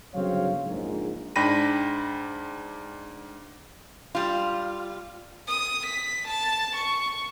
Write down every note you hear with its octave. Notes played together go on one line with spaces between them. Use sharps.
G1 C#3 F#3 C4 C#5 F5
A#1 G#2
G#2 D4 G5 B5 A#6 D#7
G3 F4
D#6
B6
A5
C#6